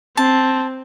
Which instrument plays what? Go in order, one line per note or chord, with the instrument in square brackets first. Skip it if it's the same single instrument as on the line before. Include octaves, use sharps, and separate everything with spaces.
[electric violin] C4 [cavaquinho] A5